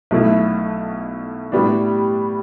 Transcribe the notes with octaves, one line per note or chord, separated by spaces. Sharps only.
B1 B2 A3 E4
A2 G3 B3 D4